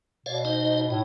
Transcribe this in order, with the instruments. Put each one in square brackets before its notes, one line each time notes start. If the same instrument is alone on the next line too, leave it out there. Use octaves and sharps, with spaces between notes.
[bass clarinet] B2 [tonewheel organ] C#5 D5 F5
[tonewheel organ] D#4 C5 D#5
[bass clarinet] A2 [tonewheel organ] D#4